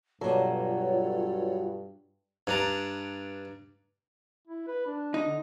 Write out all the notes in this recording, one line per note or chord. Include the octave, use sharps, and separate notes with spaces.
G2 B2 F#3 F4 A4 C#5 D5
G2 D4 A#5
E4
B4
D4
D#4
D3